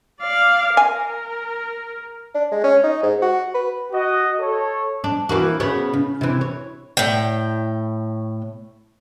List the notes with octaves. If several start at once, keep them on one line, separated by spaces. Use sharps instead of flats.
D5 F5
A#4 G#5
D4
G#3
C#4
D#4
G#2
F#4
B4
F#4 D#5
A4 C#5
D4
E3 A#3 F#4
C#3 B3 C#5
C#3
C3 E3
C#5
A2 G5